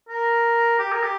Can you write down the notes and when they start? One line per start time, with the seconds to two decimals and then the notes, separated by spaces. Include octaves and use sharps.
0.09 A#4
0.79 G4
0.92 A#4
1.03 G4